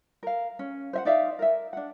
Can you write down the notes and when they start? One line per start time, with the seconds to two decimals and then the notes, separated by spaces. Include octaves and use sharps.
0.23 A#4 F5
0.59 C#4
0.93 C5 E5 F#5
1.05 D#4 D5 E5 F5
1.39 A#4 E5
1.73 D4 F#5